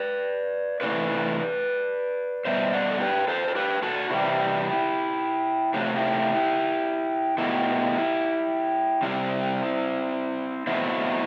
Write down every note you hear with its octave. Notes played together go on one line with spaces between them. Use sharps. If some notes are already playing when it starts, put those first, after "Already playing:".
Already playing: B4 D5
C3 E3 A3 B4 D5
B2 G3 C5 E5
D5 F#5
A4
G4 B4
A4 C5
A4
G4 B4
F#4 A4
C3 E3 G3 E4 G4
C3 F#3 A3 G4
F#4
E4 G4
B2 F#3 A3 E4 G4
C3 G3 C4 E4
B2 F#3 A3 C4 E4